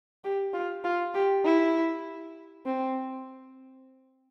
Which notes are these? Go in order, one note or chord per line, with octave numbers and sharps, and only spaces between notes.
G4
F4
F4
G4
E4
C4